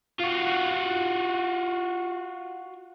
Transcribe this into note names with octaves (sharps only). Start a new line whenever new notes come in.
F4 F#4